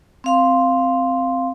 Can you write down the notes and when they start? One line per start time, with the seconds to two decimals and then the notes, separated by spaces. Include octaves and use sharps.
0.24 C4 F5 C6